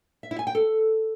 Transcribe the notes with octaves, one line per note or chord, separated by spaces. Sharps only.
E5
E4
G#5
G5
A4